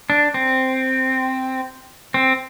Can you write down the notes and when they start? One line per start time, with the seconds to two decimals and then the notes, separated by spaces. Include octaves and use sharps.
0.10 D4
0.34 C4
2.14 C4